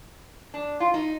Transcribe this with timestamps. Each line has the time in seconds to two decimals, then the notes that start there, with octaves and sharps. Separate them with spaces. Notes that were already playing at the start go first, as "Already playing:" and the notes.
0.54 D4
0.80 F4
0.94 D#4